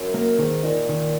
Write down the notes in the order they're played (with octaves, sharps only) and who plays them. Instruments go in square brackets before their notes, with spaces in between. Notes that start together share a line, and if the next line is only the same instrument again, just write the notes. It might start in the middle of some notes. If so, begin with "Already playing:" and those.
Already playing: [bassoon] F#2
[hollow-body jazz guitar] A#3
[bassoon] G#2 [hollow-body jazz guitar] D#3
[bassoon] A#2 [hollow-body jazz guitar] D#4
[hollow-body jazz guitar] D#3